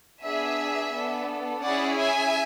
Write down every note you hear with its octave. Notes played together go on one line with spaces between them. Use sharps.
B3 D4 G#4 E5 G#5
B3 D4 A4
C#4 E4 G#4 D5 F#5
E5 G#5